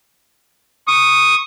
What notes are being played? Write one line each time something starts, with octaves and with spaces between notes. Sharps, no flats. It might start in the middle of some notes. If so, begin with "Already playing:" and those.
C#6 D#6